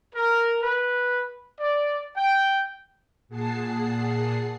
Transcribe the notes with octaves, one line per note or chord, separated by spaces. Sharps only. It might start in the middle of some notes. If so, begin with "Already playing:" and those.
A#4
B4
D5
G5
A#2 G#4 F#5 A5 C7